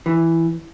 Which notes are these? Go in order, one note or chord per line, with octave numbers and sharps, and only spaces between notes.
E3